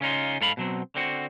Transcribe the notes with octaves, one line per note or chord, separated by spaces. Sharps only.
C#3 C#4 D#4 F4
G#2 A4 F5 B5
B2 F#3 C4
D3 C4 F#4